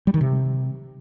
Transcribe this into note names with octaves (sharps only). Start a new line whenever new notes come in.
G3
D#3
C3